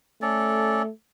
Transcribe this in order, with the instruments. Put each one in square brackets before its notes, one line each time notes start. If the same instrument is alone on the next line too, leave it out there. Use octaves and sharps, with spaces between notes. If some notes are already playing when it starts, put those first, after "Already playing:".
[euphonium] A3 [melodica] C#4 A4 D5